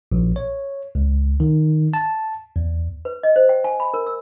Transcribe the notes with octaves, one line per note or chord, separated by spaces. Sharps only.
A#1
C#5
C#2
D#3
A5
E2
B4
D#5
C5
G5
G#5
B5
A#4
E6